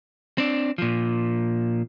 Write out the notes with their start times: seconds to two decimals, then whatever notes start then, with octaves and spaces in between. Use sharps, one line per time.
0.38 C4 D4
0.78 A#2 F3